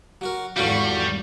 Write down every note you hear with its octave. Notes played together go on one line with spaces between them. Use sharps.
F#3 F#4 A#4
G#1 E2 G3 F4 F#4 A4 C#6